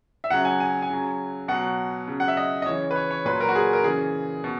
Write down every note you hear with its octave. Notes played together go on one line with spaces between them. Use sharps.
E5
C#3 F#3 F#5
G#5
G#5
G#5
C#3 F#3
B2 F#3 F#5
C#3 F#3
F#5
E5
D#5
D#5
C#3 E3 C#5
B4
C#5
C#5
A#2 F#3 B4
A#4
F#4
G#4
A#4
C#3 E3 G#4
B2